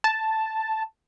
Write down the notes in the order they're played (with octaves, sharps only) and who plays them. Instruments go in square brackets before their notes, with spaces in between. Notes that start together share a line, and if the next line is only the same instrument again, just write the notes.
[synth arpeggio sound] A5